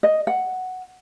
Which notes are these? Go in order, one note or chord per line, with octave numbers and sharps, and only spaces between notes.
D#5
F#5